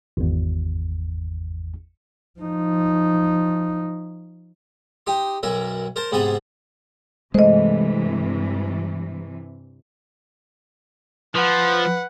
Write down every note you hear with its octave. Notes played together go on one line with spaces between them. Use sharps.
G#1 E2
F3 D#4
D#4 G4 C6
B1 F#2 A#4 E5
A#4 C5 A5
G#2 C3 B3 B4 A5 A#5
G2 C3 E3 G#3 A3 C5 D#5
F3 B4 F#5